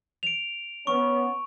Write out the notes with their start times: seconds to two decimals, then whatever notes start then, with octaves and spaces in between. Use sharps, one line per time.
0.23 D7 F7
0.87 B3 C#4 C#6